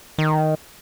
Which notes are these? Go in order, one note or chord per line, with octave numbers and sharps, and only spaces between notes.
D#3